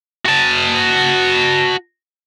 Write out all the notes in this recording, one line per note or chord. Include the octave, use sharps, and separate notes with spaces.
F#4 A5